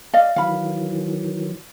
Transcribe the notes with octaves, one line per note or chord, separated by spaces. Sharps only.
D5 D#5 F5
D#3 E3 F#3 F5 B5